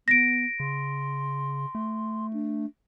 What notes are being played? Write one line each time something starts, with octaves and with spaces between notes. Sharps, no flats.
B3 A#6 D7
C#3 C6
A3
D4